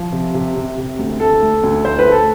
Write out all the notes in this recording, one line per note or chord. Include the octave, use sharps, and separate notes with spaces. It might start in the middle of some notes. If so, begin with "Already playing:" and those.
Already playing: F3
C3
C3
C3
C3
D2
A3 A4
A3
D2
A3 C5
B4
A3
A4